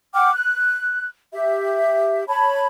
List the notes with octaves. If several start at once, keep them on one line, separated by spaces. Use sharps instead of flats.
F#5 G5 D6 F6
F#6
G4 E5
C#5 A5 B5